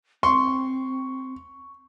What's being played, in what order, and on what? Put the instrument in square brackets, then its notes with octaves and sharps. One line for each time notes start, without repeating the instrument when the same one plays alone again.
[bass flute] C4 [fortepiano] C6 [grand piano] C#6